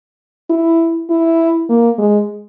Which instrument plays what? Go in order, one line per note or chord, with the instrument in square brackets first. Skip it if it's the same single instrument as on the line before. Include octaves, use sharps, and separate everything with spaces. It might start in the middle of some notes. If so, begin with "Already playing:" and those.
[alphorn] E4
E4
A#3
G#3